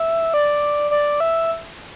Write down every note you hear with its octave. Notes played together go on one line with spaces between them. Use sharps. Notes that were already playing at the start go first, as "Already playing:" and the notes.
Already playing: E5
D5
D5
E5